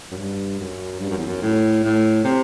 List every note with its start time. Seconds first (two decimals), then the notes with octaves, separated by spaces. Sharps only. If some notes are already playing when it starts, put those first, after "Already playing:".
0.11 F#2
0.17 G2
0.58 F#2
1.00 G2
1.09 F#2
1.18 E2
1.26 F#2
1.42 A2
1.83 A2
2.24 C3